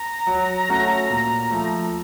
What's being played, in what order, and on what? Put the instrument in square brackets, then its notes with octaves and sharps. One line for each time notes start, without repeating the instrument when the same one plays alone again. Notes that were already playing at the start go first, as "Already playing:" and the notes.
Already playing: [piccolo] A#5
[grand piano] F#3
A3 C#4 F#4
A#2
F3 A3